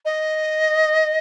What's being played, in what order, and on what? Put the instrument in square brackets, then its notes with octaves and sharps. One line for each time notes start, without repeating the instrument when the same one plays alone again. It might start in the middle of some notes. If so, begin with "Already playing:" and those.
[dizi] D#5